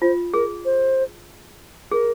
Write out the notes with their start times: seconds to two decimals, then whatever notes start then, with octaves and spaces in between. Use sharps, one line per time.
0.02 F4 C5
0.34 G#4 A#4
0.65 C5
1.91 G#4 A#4